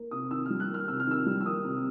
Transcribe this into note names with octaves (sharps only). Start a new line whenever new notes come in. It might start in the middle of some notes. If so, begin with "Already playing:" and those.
Already playing: A#3
C3 D#6
D#3 E6
G3 F6
F#6
A#3 F6
C3 E6
F6
D#3 E6
G3
E6
A#3 D#6
C3